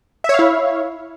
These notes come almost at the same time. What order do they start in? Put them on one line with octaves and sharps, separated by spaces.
E5 C#5 F5 E4